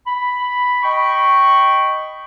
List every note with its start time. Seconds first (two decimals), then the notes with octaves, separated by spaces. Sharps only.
0.06 B5
0.83 D#5 G5 B5 C#6